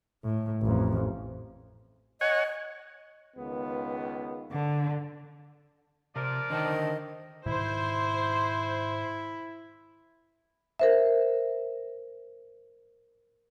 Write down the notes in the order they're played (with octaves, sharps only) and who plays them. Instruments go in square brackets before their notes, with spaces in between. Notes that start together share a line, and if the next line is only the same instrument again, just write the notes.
[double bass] A2
A1 F2
[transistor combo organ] C#5 F#5 G#5 [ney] D#5
[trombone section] C#2 D#3 B3
[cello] D3
[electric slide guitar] C3 [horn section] F3 A#4 D5
[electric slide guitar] D3 C5 A5 [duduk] D#3 [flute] D#5
[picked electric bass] G#2 B2 D#3 [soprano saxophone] E4 [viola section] C5
[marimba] A#4 C5 E5